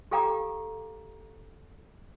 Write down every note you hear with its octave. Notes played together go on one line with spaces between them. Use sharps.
G4 A4 F5 G5 A#5 D6